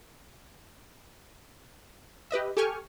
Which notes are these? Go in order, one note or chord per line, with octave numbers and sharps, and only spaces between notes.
G4 B4 D#5 E5
G4 A4 G5 G#5 C#6 F6